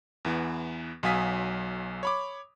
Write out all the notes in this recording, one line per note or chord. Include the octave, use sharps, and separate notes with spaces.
E2 E3 B3
B1 F#3 F5 G#5 D#6 B6
C#5 B5 D6